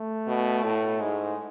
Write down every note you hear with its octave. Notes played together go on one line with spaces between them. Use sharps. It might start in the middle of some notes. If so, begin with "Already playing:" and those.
Already playing: A3
B2
A2
G#2 G#3